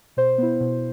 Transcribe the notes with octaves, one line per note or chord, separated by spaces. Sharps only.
B2 C5
B3 E4
B2